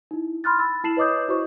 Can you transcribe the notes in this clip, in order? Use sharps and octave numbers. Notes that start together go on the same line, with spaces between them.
D#4 E4
B5 C6 F6 F#6 A6
B5 E6 A6
E4 A5 C7 E7 F#7
B4 C#5 D#5 D6 D#6 G6
E4 F#4 C5 C#6